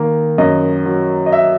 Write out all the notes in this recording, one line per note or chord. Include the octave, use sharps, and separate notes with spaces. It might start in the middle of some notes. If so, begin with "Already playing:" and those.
Already playing: D#3 A#3
F#2 D#5
F#3
D#5
E5